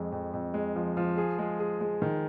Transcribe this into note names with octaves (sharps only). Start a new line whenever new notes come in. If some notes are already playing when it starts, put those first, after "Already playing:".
Already playing: F2 F3 G#3
F2
F2
G#3
F3
F3
G#4
G#3
G#4
G#3
D#3